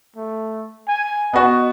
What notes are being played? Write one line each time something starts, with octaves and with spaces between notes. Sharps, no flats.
A3
G#5
B3 F#4 D#5